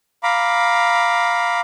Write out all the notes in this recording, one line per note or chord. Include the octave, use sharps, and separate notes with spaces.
F5 A#5 B5 D6